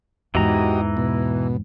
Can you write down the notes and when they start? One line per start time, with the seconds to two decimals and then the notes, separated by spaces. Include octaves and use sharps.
0.35 E2 G#2 E3 F#4 G4 D#5 A#5
0.97 B2